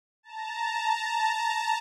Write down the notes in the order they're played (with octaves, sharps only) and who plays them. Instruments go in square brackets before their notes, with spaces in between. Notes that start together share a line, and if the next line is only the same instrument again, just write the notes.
[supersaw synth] A5 A#5